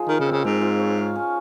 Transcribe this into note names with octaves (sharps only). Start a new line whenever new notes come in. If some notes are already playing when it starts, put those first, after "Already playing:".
Already playing: F3 G#3 D#4
D#3 A#4
C#3
C4
C#3
G#2 C4
F4
C#5
F5
C#4